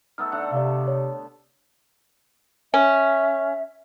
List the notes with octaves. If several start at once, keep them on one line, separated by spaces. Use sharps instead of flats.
A3 B3 D#4 E6 F6
D3 A3 F#5
C3 D5 F5
C#5
C#4 E5